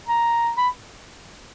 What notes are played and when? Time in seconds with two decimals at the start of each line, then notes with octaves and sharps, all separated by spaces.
0.09 A#5
0.58 B5